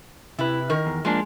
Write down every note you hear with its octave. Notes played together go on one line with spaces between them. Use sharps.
C3 E4 B4
D#3 A#4
E2
F3 G#3 A#3 D4